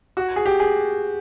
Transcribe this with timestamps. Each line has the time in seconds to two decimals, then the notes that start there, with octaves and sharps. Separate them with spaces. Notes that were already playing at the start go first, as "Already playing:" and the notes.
0.17 F#4
0.36 G#4
0.46 G4
0.60 G#4